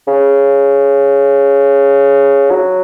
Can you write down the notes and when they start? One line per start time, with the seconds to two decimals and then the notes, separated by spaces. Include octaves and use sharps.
0.07 C#3
2.51 F#3